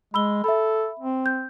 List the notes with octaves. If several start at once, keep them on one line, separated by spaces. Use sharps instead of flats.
G#3 B5 E6 G7
A4 E5 B5
C4
G6